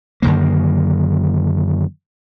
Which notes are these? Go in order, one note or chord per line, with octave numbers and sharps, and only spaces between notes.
F#2 D3 D#3 A#3